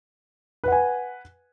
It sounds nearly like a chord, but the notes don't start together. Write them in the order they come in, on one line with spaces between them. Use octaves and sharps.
B4 F#5 G#5